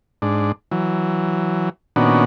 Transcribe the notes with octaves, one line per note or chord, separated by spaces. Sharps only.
G#2 D4
E3 F#3
A#2 D#3 B3 C#4 D4 F#4